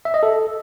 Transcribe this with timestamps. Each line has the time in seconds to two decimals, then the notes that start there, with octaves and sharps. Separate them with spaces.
0.05 E5
0.14 D#5
0.23 A4